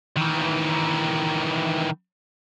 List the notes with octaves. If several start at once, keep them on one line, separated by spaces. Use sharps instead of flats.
D#3 E3